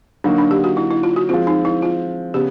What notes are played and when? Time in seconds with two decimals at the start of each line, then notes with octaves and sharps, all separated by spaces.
0.24 D3 F#3 A#3 D4 D#4 F#4
0.38 D4
0.51 G4
0.64 F#4
0.77 E4
0.91 E4
1.03 F4
1.16 F#4
1.29 F3 G#3 C4 F4
1.47 D#4
1.65 E4
1.82 F4
2.34 C#3 B3 G4